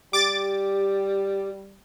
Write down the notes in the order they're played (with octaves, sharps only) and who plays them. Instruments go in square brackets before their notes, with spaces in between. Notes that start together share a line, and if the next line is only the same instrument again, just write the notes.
[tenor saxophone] G3 [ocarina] G4 [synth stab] D6 A6